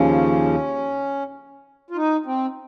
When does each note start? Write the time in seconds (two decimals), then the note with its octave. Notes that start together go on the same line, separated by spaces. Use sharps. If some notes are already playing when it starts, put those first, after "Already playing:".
Already playing: D#2 C#3 F3 C#4
1.90 F4
1.96 D#4
2.26 C4